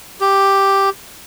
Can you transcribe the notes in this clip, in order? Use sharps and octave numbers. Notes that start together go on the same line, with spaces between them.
G4